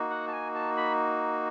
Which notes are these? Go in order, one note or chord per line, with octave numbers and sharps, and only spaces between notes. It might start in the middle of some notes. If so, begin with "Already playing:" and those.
Already playing: A#3 D#4 F#4
F#5
A5
G#5
A5
B5